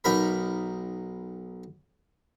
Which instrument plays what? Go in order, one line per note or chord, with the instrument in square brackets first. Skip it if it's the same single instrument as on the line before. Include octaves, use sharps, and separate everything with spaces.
[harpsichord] B1 D#4 A#4 B5